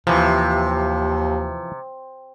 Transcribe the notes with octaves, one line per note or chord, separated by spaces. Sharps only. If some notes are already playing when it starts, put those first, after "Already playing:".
D#2 C3 E3 F3